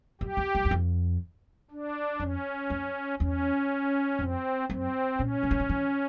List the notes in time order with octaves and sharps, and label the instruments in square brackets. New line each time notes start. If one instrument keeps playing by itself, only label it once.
[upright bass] F#2 [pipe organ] G4
[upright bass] E2
F#2
E2
F2
[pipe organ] D4
[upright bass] F2 [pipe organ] C#4
[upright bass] F2
[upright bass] E2 [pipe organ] C#4
[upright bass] F2 [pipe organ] C4
[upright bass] F#2 [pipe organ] C4
[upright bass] A#2 [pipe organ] C#4
[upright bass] C#3
D3
D#3
E3